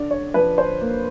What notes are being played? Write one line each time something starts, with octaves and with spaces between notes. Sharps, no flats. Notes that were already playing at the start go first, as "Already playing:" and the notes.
Already playing: D3 D5
C#5
F3 B4
C5
A#3